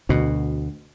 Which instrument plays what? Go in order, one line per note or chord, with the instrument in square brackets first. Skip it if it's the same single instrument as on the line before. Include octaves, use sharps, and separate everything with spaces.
[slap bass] D2 B2